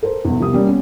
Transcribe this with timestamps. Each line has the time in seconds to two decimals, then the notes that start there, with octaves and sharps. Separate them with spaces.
0.03 A4 A#4 C5
0.25 B1 E2
0.39 C2 F3 B3 G4 D#6
0.53 G3 A#3 C#4
0.66 B3 C#4